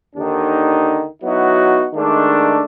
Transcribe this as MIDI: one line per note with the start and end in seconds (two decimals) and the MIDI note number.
0.16 1.05 39
0.16 1.05 50
0.16 1.05 51
0.16 1.05 62
0.16 1.05 63
1.23 1.85 54
1.23 1.85 59
1.23 1.85 63
1.23 1.85 64
1.23 1.85 66
1.94 2.64 51
1.94 2.64 56
1.94 2.64 57
1.94 2.64 62